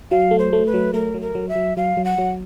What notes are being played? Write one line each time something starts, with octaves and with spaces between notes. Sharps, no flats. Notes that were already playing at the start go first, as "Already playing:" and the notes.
F#3 F5
A3
C5
A3
B4
F#3
A3 A#4
F#3
A#4
F#3
E5
F#3
F#3 F5
F#3
F#5
F#3